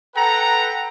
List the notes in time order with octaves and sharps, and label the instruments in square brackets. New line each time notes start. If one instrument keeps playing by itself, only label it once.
[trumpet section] A4 B4 F#5 G5 A#5